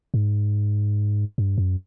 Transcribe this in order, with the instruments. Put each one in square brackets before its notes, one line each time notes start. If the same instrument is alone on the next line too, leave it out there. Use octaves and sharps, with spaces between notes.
[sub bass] G#2
G2
F#2